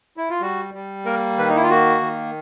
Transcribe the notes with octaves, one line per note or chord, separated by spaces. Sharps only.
E4
F4
G3 F#4
G3
A#3 A#4
D#3 B4
D#4
E4
F4
A#3 F#4
D#3